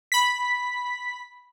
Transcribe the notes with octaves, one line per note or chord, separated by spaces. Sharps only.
B5 B6